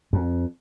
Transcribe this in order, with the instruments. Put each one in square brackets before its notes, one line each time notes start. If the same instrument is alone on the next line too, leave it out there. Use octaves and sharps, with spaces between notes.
[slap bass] F2